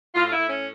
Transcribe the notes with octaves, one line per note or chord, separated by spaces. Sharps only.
A2 F4
F4
E4
A2
C#4